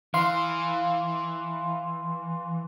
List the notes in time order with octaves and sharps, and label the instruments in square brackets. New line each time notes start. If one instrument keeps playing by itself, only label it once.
[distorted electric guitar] E3 [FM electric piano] F5 C6